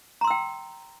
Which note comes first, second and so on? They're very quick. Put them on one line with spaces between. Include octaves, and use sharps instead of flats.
A#5 C6 E6 G5